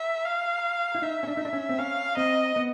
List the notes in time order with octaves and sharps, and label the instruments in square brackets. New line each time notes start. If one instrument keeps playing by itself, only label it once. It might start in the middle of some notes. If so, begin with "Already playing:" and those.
Already playing: [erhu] E5
F5
[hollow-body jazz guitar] E4
[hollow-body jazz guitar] D#4 [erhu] E5
[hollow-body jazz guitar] C#4
D4
D#4
D4
C#4
C4
[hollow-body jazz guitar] C#4 [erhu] F5
[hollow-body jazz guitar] C4 [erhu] D#5
[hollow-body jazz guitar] B3